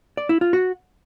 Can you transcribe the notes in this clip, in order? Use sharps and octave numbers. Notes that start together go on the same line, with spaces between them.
D5
E4
F4
F#4